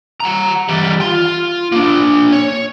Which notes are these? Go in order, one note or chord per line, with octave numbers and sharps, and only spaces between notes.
F#5 A#5
E3 G3
F4 C6
A#3 D4
C#5